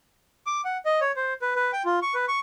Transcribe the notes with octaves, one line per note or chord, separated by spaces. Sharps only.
D6
F#5
D#5
C#5
C5
B4
B4
G5
F4
C#6
B4
C#6